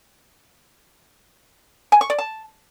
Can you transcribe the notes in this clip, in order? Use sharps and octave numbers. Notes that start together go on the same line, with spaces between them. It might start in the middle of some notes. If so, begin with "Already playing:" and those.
G#5
C#6
D5
A5